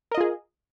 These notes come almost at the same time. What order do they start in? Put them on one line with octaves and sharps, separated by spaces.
A#4 D#5 F4 G#4